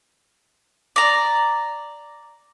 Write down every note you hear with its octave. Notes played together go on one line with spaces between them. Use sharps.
D5 A#5